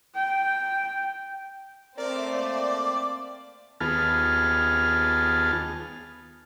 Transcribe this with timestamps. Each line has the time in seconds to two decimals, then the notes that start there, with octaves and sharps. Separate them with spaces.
0.15 G5
1.97 A3 C4 A#4 C5 D5
2.33 A#3 D5
3.80 D#2 B3 F4 G#4 A5 F6